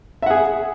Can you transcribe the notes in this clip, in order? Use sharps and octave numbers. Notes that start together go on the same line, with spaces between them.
G#4 E5 F#5